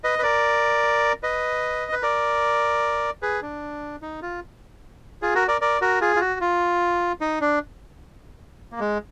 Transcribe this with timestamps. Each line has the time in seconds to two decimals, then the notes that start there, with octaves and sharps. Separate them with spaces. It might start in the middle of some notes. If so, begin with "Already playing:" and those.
0.04 B4 D#5
0.19 B4
0.23 A#4 D5
1.23 B4 D#5
1.92 B4
2.02 A#4 D5
3.22 G#4 B4
3.42 D4
4.02 D#4
4.22 F4
5.22 F4 G#4
5.35 F#4 A#4
5.48 A#4 D5
5.61 A#4 D5
5.81 F#4 A#4
6.01 F4 G#4
6.16 F4
6.21 F#4
6.41 F4
7.21 D#4
7.41 D4
8.72 A#3
8.80 G#3